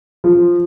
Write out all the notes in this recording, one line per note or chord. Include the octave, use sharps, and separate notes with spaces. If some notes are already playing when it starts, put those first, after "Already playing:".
F3